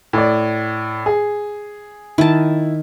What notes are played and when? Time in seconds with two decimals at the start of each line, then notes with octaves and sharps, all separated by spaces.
0.13 A2 D5
1.06 G#4
2.18 D#3 E4 A5